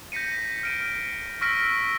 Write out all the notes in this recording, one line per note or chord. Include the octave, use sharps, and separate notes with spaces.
G6 A#6 B6 C#7 D#7
F6 D7 D#7
C#6 E6 F6 A#6 B6 D7